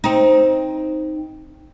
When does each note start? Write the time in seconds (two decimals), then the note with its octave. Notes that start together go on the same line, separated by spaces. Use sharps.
0.04 C4 D#4